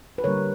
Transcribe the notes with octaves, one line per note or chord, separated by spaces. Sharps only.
B4
D3 G3 A#3 D4 A#4 C#5